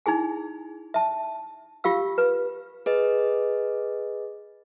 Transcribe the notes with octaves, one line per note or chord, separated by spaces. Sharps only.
D#4 E4 G#4 G#5
E5 A5
F4 G4 F5 E6
B4
G#4 B4 D#5